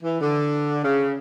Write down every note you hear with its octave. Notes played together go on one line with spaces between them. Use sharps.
E3
D3
C#3